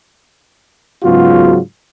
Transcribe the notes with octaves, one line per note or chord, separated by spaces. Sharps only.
G#2 C#3 F#3 B3 F4 F#4